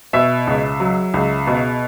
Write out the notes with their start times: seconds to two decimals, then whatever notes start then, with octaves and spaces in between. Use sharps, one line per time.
0.13 B2 E5
0.47 C#2
0.80 F#3
1.14 C#2
1.47 B2